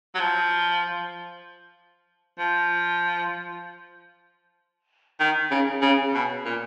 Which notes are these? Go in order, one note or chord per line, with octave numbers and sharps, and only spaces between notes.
F#3
F3
F3
D#3
C#3
C#3
B2
A#2